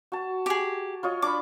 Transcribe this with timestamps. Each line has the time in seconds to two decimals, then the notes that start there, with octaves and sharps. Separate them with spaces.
0.12 F#4 A5
0.46 G4 G#4
1.03 F4 C#5 D#5
1.22 D4 B5 D6